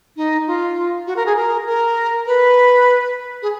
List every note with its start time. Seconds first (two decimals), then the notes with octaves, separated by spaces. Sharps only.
0.17 D#4
0.47 F4
1.07 F#4
1.16 A#4
1.26 G#4
1.37 A#4
1.67 A#4
2.26 B4
3.42 G#4